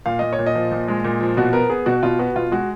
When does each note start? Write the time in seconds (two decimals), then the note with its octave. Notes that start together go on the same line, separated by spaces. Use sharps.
0.06 A#2 F5
0.19 A#2 D#5
0.33 C#5
0.39 A#2
0.46 D#5
0.55 F3
0.72 A#2
0.88 G#3
1.04 A#2
1.21 F3
1.37 B2 F#4
1.53 B3 A#4
1.69 B3 G#4
1.86 B2 F#4
2.03 B2 F4
2.19 B3 F#4
2.35 B2 F4
2.52 G#3 F#4